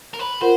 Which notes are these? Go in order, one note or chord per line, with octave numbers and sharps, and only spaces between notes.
A#4
B4
F4 A#4 C5 F#5